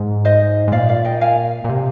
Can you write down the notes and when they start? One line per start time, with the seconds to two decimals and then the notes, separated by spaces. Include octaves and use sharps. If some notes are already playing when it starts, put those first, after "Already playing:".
Already playing: G#2
0.25 C5 D#5
0.68 G#2
0.72 A#2 D5 F5
0.89 D5 F5
1.05 D#5 G5
1.21 F5 G#5
1.64 A#2
1.69 C3